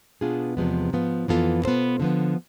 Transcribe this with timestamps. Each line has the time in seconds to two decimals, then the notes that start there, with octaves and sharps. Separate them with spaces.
0.21 B2 B3 D4 F4 G#4
0.57 E2 C3 F3 G#3 B3
0.93 G#2 F3 B3 F4
1.28 F2 E3 B3 F4 A4
1.65 B2 B3 F4 A4 C5
2.00 D3 F3 B3